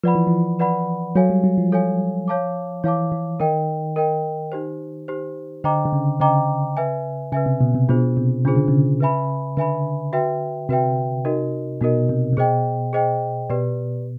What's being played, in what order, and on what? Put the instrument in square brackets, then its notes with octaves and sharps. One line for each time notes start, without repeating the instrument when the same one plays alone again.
[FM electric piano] F3 [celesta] B4 D5 F#5 B5
[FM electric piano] E3
F3
[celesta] B4 D5 F#5 B5
[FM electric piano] F#3 [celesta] A4 C#5 F5 G#5
[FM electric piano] G3
F#3
F3
[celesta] A4 C#5 F5 G#5
C#5 F5 A5 D6
[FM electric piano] E3 [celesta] C#5 F5 A5 D6
[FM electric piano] E3
[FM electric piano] D#3 [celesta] A#4 D#5 G5
[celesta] A#4 D#5 G5
D#4 G4 C5
D#4 G4 C5
[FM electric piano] D3 [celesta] C5 D#5 G5 A#5 D6
[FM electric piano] D3
C#3
[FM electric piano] C#3 [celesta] C5 D#5 G5 A#5 D6
[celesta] B4 E5 G#5
[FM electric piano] C#3 [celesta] B4 E5 G#5
[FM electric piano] C3
B2
C3
[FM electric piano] B2 [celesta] D4 F4 G#4 C5
[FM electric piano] C3
[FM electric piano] C#3 [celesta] D4 F4 G#4 C5
[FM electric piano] D3
C#3
[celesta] B4 E5 G#5 B5
[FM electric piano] D3 [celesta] B4 E5 G#5 B5
[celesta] F#4 B4 E5 G5
[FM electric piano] C3 [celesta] F#4 B4 E5 G5
[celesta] D#4 F#4 A#4 D#5
[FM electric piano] B2 [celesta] D#4 F#4 A#4 D#5
[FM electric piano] C3
C3
[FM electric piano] B2 [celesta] G#4 C5 D#5 G5
[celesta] G#4 C5 D#5 G5
[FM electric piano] B2 [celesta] G4 B4 D5